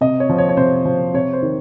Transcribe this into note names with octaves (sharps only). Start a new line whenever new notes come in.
C3 D#5
C#5
F3
C#5
C#5
C3 C5
F3
C3 C#5
C5
D#3